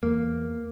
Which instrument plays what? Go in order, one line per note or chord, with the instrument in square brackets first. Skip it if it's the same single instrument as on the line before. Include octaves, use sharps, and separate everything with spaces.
[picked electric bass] E2 A#3